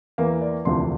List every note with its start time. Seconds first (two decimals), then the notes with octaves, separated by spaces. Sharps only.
0.18 E2 E3 A#3
0.41 D5
0.65 E1 D2 C3 F3 C6